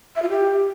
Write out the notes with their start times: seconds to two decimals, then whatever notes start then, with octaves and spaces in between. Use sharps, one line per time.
0.16 E5
0.22 F4
0.29 G4